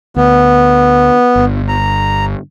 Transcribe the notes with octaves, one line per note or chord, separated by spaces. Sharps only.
D2 B3
G1
A#5